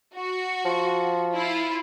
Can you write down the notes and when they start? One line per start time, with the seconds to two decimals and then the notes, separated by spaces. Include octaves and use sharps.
0.14 F#4
0.65 F3
1.35 E4 F4